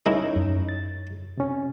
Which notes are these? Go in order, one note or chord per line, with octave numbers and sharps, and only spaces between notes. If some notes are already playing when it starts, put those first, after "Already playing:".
G#3 C#4 D#4 E4 A#4 C#5
F#2
A6
C3 C#4